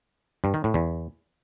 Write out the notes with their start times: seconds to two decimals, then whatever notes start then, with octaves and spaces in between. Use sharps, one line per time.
0.44 G2
0.54 D#3
0.64 A2
0.74 E2